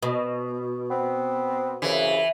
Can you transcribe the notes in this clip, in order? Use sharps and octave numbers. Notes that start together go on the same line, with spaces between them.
B2
B3 C4
C2 F#2 C#3 E3